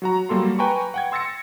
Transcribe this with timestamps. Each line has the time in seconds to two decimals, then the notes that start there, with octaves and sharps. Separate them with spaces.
0.02 F#3 F#4 A#5
0.29 F#3 G3 A#3 A4 C6
0.59 B4 G5 G#5 A#5 C#6
0.94 F#5 G5 G#6
1.12 C6 E6 A6 A#6 C#7